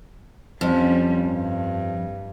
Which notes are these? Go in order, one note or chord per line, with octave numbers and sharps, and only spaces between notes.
F2 F3 G3 C#4
G2